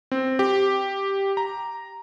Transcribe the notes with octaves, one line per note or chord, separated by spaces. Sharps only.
C4
G4
A#5